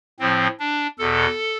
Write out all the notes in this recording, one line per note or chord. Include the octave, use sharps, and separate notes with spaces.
A2 F3 C4
D4
E2 B2 A4